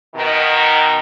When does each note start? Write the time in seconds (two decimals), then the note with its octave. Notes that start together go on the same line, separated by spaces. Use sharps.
0.15 B2 D#3